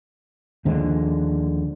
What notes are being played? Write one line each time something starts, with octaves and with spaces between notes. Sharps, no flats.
D#2 D3 F3 G#3